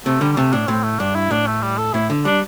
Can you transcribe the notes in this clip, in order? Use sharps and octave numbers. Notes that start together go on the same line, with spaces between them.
C3 A3
D3 G3
G3
C3 A3
A2 D4
A2 C4
A3
G2 D4
E4
A2 D4
A3
G3
A4
A2 E4
D3
G3 D4